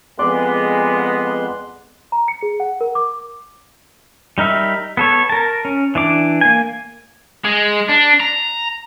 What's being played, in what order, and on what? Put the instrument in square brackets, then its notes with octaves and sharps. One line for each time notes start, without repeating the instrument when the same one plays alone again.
[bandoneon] F2 C6 F#6 [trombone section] G#3 B3 [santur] D5
[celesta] A#5
C#7
G#4
F#5
A#4
D6
[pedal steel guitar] G3 D#4 A#4 E5
B3 A4 C#5
A#4 A5
C#4
E3 D4 D6
A#3 G#5
[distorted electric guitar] G#3
D4
A#5